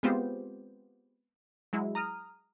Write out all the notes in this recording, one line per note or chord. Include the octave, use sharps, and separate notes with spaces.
G#3 B3 C4 F4 G4 C5
F#3 G#3 E4
A#5 D#6 F6